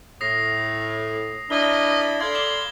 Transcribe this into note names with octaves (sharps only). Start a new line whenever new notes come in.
A2 D#6 A#6 C7
D4 E4 A#4 D#5 B5 G7
A4 D5 F5 B5 C6 G#6
D6 F#7 G7